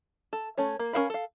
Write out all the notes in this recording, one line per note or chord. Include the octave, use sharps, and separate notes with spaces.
A4
A3 C#4 C#5
A#3
C#4 A4 A#4 F5 B5
A4 F5